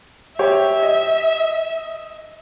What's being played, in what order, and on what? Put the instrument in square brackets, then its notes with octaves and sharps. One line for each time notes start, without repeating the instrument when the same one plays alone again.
[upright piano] G4 C#5 [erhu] E5
[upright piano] D#5